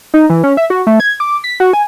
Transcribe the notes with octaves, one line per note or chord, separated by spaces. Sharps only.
D#4
E3
C#4
E5
F#4
A3
G#6
D6
B6
F#4
G#5